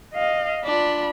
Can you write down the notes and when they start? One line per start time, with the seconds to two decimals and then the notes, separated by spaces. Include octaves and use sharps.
0.14 D#5 F5
0.65 D4 F4 B5